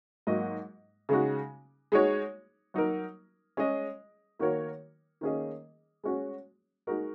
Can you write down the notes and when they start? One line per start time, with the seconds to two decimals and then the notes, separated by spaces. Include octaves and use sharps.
0.27 G#2 F#3 A#3 F#4 D#5
1.09 C#3 G#3 D#4 F#4
1.92 G#3 D#4 F#4 C#5
2.74 F#3 D#4 A#4
3.57 G#3 C#4 G#4 D#5
4.39 D#3 A#3 F#4 A#4 C#5
5.21 D#3 A#3 C#4 G#4 D#5
6.04 G#3 C#4 F#4
6.87 G#3 D#4 F#4 A#4